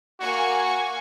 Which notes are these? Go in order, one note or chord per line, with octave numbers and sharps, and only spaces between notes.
A#3 F#4 G#5 C#6